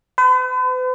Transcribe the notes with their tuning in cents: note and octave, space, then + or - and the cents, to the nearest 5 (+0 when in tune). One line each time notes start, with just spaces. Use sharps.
B4 +45